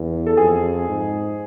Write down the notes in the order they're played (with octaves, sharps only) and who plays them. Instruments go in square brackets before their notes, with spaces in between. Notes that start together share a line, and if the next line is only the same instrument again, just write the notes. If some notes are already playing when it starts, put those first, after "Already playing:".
Already playing: [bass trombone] E2
[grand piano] A4
[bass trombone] F2 [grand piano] G#4
[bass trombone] G#2